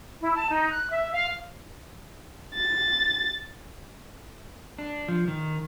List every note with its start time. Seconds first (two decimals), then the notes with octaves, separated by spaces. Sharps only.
0.21 E4
0.35 A5
0.49 D#4
0.70 F#6
0.89 E5
1.13 F5
2.56 A6
4.78 D4
5.08 F3
5.28 D#3